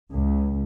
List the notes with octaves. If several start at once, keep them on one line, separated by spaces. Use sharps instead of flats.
C#2